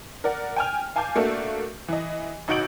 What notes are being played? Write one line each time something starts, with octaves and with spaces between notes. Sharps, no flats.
A#4 D5 F#5
G5 G#5 F6
F5 G#5 A5 D6 G6
A3 A#3 D4 F#4 A4
E3 D#5
A1 D#4 F#4 G6 D7 F#7